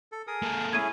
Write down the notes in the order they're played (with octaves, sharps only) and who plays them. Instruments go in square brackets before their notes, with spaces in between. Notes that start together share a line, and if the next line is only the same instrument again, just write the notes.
[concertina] A4
G#4 A#4 D#6
[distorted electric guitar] A#3 A4
[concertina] C#4 E4 G#4 [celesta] G#6 D#7